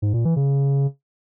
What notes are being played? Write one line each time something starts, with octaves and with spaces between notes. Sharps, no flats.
G#2
A#2
E3
C#3